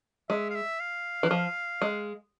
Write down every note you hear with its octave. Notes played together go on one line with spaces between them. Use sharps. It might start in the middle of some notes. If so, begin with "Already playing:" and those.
G#3 E5
F5
E5
F5
E3
F3
G#3